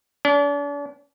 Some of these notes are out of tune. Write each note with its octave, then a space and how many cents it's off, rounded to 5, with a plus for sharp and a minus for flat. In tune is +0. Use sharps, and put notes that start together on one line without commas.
D4 -40